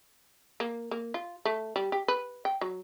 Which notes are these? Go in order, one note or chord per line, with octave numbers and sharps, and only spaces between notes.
A#3
A#3
F4
A3
G3
G4
B4
G5
F#3